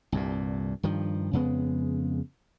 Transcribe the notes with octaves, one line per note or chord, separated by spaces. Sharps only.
C2 G2 A#2
G2 D#3 F3
F2 C#3 G#3 B3